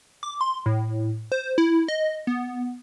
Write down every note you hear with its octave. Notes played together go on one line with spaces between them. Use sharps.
D6
C6
A2
C5
E4
D#5
B3